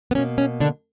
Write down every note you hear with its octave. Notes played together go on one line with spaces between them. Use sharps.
B3
B2 A#3 C#4
C#4
D3 D4